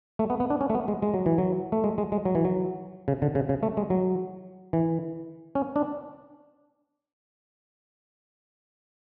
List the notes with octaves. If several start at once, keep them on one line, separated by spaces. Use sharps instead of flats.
A3
B3
B3
D4
C#4
A3
B3
G#3
G#3
F#3
E3
F#3
A3
G#3
G#3
G#3
F#3
E3
F#3
C#3
D3
C#3
C#3
A3
G#3
F#3
E3
C#4
D4